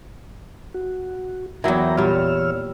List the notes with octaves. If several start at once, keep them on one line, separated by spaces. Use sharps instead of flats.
F#4
E2 G#2 F#3 E4 A#4 G5 A#5
A#2 G3 C#5 E6 F6